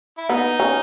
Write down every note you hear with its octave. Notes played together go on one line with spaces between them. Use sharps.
E4
B3 D#4
C#4